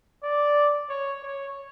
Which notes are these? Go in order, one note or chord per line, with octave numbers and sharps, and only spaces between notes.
D5
C#5
C#5